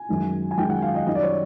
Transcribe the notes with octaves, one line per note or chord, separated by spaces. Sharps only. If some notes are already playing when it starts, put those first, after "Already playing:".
Already playing: G#5
F#2 D#3 G#3
G#5
F#2 D#3 G#3 G5
F#5
F5
D#5
F#2 D#3 G3 D#5
D5
C#5